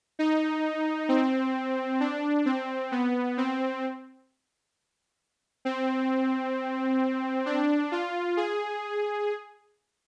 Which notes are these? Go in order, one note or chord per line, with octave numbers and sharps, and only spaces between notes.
D#4
C4
D4
C4
B3
C4
C4
D4
F4
G#4